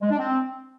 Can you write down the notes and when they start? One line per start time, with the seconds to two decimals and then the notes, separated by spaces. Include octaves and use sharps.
0.01 G#3
0.10 D4
0.19 C4